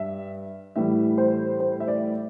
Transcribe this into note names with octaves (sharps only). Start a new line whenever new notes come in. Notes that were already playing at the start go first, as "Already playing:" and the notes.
Already playing: G2 G3 E5
A2 E3 G3 E5
C5
C5
E5
D5